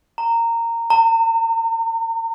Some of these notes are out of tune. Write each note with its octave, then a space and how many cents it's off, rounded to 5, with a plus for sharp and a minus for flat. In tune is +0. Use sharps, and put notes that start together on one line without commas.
A#5 -15
A#5 -40